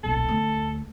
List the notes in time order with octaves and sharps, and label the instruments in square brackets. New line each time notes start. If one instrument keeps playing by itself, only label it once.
[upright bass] D#1 B1 [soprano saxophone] A4
[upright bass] D2